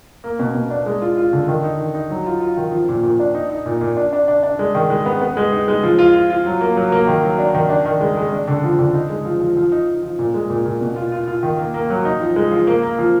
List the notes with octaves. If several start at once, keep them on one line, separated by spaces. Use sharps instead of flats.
A#3
B2
B2
D4
G#3
F4
F4
D3
D#3
D#4
D#3
D#4
F#3
F4
F4
D#3
F3
A#2
A#2
D4
D#4
D#4
A#2
A#2
D4
D4
D4
D4
G#3
D#3
G#3
B3
B3
G#3
D#4
G#3
F3
F4
F4
F4
F#3
A#3
F#3
A#3
D#3
F#3
D4
D#3
D4
D#3
G#3
G#3
D4
D3
F3
D3
D#4
G#3
F3
F3
F3
D#4
D#4
F3
A#2
G#3
A#2
A#2
B2
F4
F4
F4
D#3
A#3
A#3
F#3
D#4
F3
G#3
F3
A#3
A#3
F3